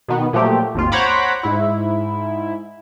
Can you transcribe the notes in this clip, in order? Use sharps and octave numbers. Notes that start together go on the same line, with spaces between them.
B2 D#3 B3
A#2 F3 F#3 A3 G4
G#1 D#2 F4
C5 C#5 F#5 A#5 B5 D6
G#2 E4